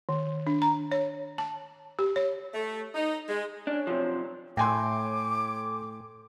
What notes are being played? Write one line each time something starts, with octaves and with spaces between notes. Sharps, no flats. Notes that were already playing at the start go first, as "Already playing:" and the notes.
D#3
D4
A#5
C#5
A5
G4
C#5
A3
D#4
G#3
C#4 D4
C3 F3 F#3
A2 G5 G#5 C6 D6